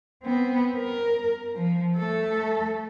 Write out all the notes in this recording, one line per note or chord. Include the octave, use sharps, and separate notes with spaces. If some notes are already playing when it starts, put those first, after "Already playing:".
B3 C4
A#4
F3
A3 A4